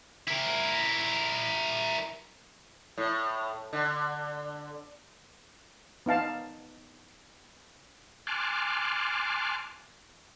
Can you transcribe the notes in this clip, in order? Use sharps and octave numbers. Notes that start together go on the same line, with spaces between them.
E4 A#4
A2
D3
B3 D#4 F5 A5
G#5 A5 C6 D6 F6 F#6